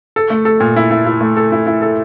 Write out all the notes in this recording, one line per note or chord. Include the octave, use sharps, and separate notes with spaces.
A4
A3
A4
A#2
E4
E4
E4
A3
A4
E4
E4
A4